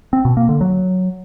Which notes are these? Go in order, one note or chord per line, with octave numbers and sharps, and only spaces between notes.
C4
B2
A#3
D3
F#3